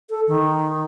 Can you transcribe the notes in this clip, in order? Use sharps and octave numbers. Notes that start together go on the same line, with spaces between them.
A4
D#3